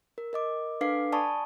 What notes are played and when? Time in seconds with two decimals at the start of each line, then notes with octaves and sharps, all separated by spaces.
0.18 A#4
0.33 A#4 D#5 D6
0.81 D4 A4 B4 F5 D6 C7
1.12 D5 G#5 A5 B5 C#6 D#6